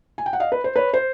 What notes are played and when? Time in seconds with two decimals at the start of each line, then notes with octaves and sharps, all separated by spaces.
0.18 G#5
0.26 G5
0.33 F#5
0.40 D#5 F5
0.52 B4
0.64 C5
0.76 B4 C#5
0.94 C5